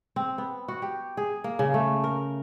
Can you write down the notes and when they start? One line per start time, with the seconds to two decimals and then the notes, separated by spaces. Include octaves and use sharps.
0.16 C4
0.38 B3
0.68 F#4
0.82 G4
1.17 G#4
1.44 A#3
1.59 C#3
1.74 A3
2.04 A#4